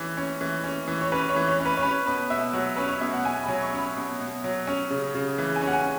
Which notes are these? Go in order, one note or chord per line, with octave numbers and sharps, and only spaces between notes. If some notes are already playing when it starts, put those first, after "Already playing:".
Already playing: E3 C#4
C#4
E3
C#4
E3
C#5
C#4 B4
C#5
E3
C#5
C#4
B4
C#5
C#4 B4
B2 B4
B2 E5
F#3 F#5
C#4 B4
C#5
B2 E5
F#5
B2 G#5
B5
F#3
C#6
C#4
B5
B2
B2
F#3
C#4
C#3
C#3
E3
G#5
C#4
F#5
G#5